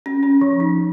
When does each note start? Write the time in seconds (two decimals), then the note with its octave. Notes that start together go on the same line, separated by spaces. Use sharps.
0.06 C#4
0.23 C#4
0.41 F3
0.60 D#4